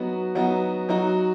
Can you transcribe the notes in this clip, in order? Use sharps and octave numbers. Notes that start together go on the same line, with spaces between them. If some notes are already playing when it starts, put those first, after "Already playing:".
Already playing: F#3 B3 D#4 F#4
F#3 B3 D#4 F#4
F#3 D#4 F#4